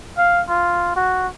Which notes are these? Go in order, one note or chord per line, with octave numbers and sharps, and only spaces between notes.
F5
F4
F#4